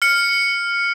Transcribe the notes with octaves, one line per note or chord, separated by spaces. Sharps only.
F6 C#7